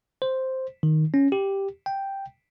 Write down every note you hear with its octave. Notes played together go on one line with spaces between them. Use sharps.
C5
D#3
C#4
G4
G5